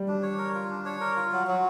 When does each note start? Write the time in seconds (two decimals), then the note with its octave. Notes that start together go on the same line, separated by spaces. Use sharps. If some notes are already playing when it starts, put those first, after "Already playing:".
Already playing: G3
0.08 D4
0.22 C#5
0.38 A#4
0.55 F4
0.70 D4
0.85 C#5
1.00 A#4
1.16 F4
1.32 F#3
1.47 F#3